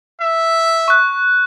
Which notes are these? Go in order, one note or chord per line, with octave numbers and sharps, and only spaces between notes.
E5
C#6 F#6